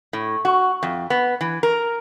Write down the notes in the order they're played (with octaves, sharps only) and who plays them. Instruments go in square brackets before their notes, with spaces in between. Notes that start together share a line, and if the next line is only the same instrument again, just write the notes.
[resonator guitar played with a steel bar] A2
F#4
F2
B3
E3
A#4